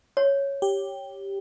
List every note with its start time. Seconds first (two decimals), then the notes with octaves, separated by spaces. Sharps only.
0.17 C#5
0.62 G4